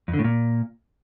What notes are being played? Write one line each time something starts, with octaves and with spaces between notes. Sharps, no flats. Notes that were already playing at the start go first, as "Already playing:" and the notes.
F2
D3
A2
A#2